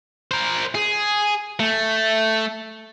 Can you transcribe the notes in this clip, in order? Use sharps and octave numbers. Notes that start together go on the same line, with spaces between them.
A#4 C5
G#4
A3